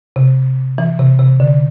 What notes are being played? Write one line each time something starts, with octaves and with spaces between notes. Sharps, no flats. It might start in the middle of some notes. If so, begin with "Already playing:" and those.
C3
E3
C3
C3
D3